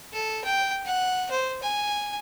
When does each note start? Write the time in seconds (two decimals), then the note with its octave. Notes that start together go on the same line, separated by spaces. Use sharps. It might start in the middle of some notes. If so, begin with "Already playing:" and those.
0.13 A4
0.44 G5
0.86 F#5
1.31 C5
1.62 G#5